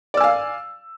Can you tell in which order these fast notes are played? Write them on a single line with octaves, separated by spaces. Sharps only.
D5 E6 G#5 F5